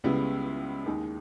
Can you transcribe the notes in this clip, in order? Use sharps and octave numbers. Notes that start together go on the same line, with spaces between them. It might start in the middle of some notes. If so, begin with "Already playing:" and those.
C#2 C#3 G3 B3 E4
D#2 D#3 G#3 D#4 G#4